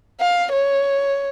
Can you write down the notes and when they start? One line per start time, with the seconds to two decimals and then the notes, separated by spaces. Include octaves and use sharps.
0.20 F5
0.52 C#5